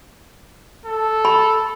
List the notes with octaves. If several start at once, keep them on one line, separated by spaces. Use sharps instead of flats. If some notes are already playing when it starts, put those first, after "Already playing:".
A4
B5